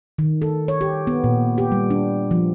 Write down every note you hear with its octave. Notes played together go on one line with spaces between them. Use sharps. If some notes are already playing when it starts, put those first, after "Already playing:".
D#3
A4
C#5
G4
B3
A#2
G4
G3
D4
F3